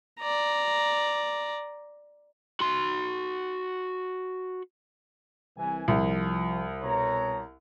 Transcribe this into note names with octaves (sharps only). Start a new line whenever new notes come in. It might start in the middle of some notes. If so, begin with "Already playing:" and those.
D5 A#5
F#4 C6
C2 E3 G#5
C2 F3
B2 C#5 A#5